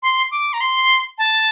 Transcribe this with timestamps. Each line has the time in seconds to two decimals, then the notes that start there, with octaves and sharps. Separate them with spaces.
0.03 C6
0.31 D6
0.53 A#5
0.61 C6
1.18 A5